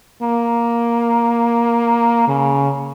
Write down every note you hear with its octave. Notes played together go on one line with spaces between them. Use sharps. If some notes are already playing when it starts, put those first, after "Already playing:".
A#3
C#3